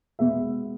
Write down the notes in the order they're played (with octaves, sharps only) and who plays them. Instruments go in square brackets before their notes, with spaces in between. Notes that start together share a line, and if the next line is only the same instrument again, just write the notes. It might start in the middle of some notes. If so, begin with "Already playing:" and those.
[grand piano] B2 G#3 B3 E5